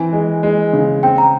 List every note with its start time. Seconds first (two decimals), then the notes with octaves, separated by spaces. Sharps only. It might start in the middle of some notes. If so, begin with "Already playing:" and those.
Already playing: E3 C4 G#5
0.13 G#3
0.43 G#3
0.73 C#3
1.03 C4 G5
1.18 A#5